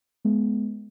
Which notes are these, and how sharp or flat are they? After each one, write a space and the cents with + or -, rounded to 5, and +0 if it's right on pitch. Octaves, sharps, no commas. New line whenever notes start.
G#3 +25 B3 +0